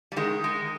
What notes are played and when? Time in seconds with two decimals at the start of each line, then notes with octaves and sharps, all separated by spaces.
0.12 G3
0.16 D#3 G#3
0.44 G#3